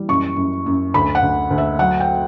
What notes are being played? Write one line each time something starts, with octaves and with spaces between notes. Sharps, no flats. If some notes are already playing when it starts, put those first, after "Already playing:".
Already playing: E3 G3
F#2 C#6
F#2
F#2
D2 B5
F#5
D2
D2
E5
F#3 F#5
G5